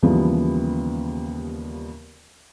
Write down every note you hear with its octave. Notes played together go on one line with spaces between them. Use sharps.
D#2 C#3 E3 F3 G3 B3